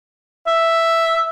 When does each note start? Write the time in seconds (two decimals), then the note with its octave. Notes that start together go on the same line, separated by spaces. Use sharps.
0.47 E5